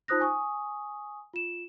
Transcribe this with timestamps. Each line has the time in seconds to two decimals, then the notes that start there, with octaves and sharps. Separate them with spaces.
0.08 D#4 F4 C5 D#6 F#6 A#6
0.20 G#5 C#6 D#6
1.33 F4 E7